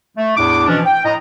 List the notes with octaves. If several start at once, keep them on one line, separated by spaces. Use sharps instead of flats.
A3
E2 A2 D4 D6
B2 E3 F3 C#4 D4
G5
A2 D#5 A#5